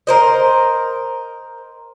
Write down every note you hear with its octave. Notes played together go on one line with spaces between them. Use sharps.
A#4 C5 D#5